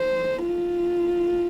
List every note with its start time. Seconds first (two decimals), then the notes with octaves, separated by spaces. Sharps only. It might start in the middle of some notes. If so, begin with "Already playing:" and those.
Already playing: C5
0.45 F4